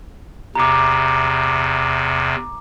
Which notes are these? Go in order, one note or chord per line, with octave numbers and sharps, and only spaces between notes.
E2 C3 A#5 D6